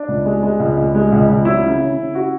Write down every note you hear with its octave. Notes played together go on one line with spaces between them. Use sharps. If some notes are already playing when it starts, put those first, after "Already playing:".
Already playing: D4
C#2
G#3
G#3
C#2
C#2
G#3
C#2
C#2
F#3 E4
C#3
C#3
C#3
F#4